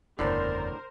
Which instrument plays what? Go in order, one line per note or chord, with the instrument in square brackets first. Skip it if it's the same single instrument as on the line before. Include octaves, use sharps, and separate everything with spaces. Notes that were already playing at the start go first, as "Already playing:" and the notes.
[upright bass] F#1 E2 [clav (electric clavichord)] A2 D3 [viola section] A#4 C5 [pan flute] D5